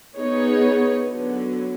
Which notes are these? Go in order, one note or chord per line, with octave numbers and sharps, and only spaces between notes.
B3 D#4 G#4 C#5
D3 F#3 B3